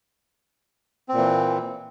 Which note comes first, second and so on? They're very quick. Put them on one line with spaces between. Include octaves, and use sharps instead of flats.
C4 A#2 E3